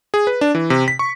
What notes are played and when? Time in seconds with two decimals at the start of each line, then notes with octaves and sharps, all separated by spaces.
0.14 G#4
0.27 B4
0.41 D4
0.55 E3
0.70 C3
0.88 B6
0.99 C#6